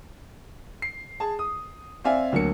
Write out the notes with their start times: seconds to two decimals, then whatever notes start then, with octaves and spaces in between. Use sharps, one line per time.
0.82 C7
1.20 G#4 A5
1.39 D#6
2.04 C4 D5 E5 F5 G#5
2.32 D2 F#3 A#3 C#7